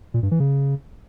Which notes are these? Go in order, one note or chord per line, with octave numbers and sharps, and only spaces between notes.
A#2
G2
E3
C#3